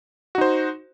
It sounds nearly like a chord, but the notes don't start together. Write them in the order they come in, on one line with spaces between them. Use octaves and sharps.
F#4 D#4 C5